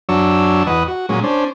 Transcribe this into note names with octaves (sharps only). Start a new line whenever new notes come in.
F#2 F#3 D4 C#5 E6
E2 B4 D#5 F#5
F#4
A#2 F#3 G#3 C#4
C#4 D4 C5